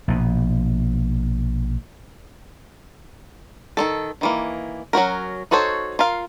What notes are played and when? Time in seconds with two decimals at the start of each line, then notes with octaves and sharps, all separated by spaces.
0.08 A#1 B2
3.77 D#3 A3 A4
4.21 D#3 E3 A#3
4.93 F#3 C#4 F#4 A#4
5.51 D#4 F#4 A4 C5 C#5
5.99 F4 A#4 F5